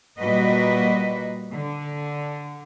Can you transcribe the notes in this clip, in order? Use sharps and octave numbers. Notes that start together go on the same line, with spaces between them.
A#2 G3 A#3 F#4 B4 D#5
D3